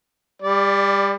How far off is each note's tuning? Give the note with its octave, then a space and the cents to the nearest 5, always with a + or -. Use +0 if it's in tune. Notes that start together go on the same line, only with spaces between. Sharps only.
G3 +25 D5 +0